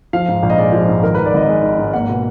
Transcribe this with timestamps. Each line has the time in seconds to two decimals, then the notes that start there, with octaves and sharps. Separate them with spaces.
0.13 F3 F5
0.28 G#2
0.43 A#1
0.50 D#5
0.58 G#3 D5
0.72 F3
0.88 G#2
1.03 D#3 A#4
1.14 G#2 B4
1.26 D5
1.34 G#1 D#5
1.49 G#3
1.63 D#3
1.78 G#2
1.93 A#3 F#5
2.09 B2